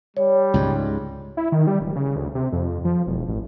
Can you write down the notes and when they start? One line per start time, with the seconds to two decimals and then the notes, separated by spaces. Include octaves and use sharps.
0.17 G3 C#5
0.54 C#2 G#2
1.37 E4
1.52 D#3
1.67 G3
1.80 D1
1.96 C#3
2.16 D2
2.35 C3
2.52 F2
2.85 F3
3.07 E1
3.28 A1